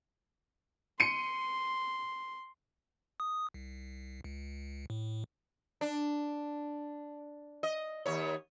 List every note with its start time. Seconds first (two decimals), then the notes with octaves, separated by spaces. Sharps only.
1.00 C6 C#7 D#7
3.20 D#6
3.54 C2
4.24 C#2
4.90 A2
5.81 D4
7.63 D#5
8.06 D#2 C#5